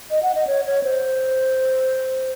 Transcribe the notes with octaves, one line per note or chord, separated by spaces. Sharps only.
D#5
F#5
D#5
C#5
C#5
C5